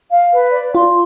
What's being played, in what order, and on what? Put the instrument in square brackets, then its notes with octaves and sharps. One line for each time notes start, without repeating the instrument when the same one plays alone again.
[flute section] F5
B4
D5
[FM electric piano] F4 [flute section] C6